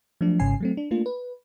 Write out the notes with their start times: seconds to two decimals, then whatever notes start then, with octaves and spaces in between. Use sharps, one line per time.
0.21 F3 F#3 A3 D4
0.39 G#1 G#2 C#3 C#4 G#5 C7
0.60 F#3 A3 C4
0.77 D4
0.91 A3 A#3 D4 F4
1.06 B4